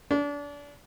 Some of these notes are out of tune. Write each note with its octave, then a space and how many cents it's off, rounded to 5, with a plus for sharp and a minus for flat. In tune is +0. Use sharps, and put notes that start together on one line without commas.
D4 -30